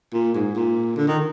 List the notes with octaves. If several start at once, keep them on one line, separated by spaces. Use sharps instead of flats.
A#2
G#2
A#2
D3
D#3